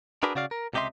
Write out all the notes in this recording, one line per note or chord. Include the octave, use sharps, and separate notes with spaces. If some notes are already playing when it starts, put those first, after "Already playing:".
D4 F#4 G#4 A#4 B4 D5
C#3 F#4 D5 F5
A#4
C#2 C3 G4 D#5 E5 C6